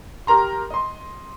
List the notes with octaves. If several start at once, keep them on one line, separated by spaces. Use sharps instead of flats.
G4 A#4 A#5 C6
D#5 C6